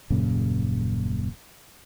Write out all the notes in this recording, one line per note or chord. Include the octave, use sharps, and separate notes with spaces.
D#1 F#2 A#2 C#3